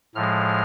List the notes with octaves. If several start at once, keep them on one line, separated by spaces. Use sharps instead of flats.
A2 F3 G#3 F6